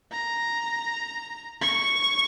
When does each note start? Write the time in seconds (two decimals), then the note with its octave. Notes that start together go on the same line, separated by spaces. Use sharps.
0.12 A#5
1.61 C#6